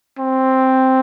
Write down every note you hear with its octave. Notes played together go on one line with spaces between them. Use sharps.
C4